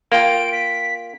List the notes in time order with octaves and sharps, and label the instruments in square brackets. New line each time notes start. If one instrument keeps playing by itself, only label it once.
[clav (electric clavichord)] A#3 F4 G5 [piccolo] D7
[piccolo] B6